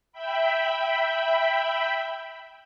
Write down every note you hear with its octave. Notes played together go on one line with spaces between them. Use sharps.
E5 G5 B5